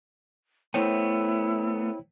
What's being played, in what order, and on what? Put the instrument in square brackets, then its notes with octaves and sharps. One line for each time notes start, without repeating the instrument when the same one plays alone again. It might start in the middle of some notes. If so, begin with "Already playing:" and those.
[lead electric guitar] A3 B3 [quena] E4 [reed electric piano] C5 C#5 G5